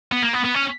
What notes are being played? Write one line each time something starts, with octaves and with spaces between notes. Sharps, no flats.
B3
A#3
B3
B3
C#4